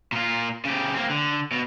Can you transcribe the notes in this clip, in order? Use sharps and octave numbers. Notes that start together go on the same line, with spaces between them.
A#2 F4
C#3 G4
A#3 C4
D3
B2